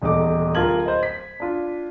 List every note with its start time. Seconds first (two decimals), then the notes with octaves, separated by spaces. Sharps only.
0.02 D#1 E2 D#4 A4 D6
0.55 D1 F4 A#4 A5 G#6 F#7
0.85 C5 D#5
1.03 B6
1.40 D4 F4